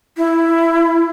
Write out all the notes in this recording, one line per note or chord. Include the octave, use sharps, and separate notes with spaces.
E4